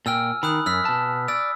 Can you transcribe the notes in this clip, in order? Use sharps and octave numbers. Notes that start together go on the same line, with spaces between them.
A#2 G5 G#5 E6 F6
D#3 B5 D#6 F#6
F#2 E6 F6 B6
B2 A5
D5 E6